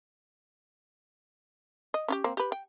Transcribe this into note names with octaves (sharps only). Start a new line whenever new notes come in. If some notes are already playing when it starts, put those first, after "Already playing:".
D#5
C#4 F4 G4
A#3 C4
G4 B4
G5